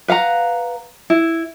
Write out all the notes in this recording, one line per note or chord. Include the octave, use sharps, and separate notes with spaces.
B4 F5 F#5 A#5
E4